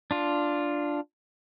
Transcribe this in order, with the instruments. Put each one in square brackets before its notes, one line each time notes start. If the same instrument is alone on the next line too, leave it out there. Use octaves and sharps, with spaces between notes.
[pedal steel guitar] D4 F4